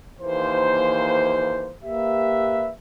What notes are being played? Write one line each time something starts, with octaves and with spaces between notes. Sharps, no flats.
D#2 E3 A#3 C5
A#3 G4 B4 E5